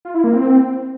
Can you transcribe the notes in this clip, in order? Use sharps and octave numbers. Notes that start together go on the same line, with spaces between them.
F4
E4
A#3
C4